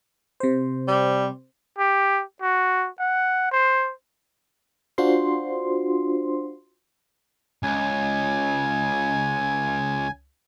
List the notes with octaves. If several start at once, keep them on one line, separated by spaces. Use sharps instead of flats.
C3 C5
G3
G4
F#4
F#5
C5
D4 F4 F#4 C5 C6
C#2 G#5